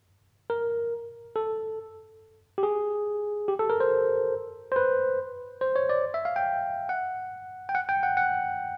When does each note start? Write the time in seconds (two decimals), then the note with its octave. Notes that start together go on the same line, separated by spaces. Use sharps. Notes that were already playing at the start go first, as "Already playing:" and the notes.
0.50 A#4
1.36 A4
2.58 G4
2.63 G#4
3.48 G4
3.59 A4
3.70 A#4
3.80 C5
4.72 C5
4.76 B4
5.61 C5
5.76 C#5
5.89 D5
6.14 E5
6.25 F5
6.36 G5
6.89 F#5
7.69 G5
7.75 F#5
7.89 G5
8.03 F#5
8.17 F#5